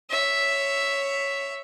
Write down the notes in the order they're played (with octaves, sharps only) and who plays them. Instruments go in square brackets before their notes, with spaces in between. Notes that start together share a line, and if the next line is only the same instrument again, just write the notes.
[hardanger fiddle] C#5 E5